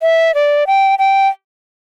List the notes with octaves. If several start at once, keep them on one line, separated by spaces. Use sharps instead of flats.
E5
D5
G5
G5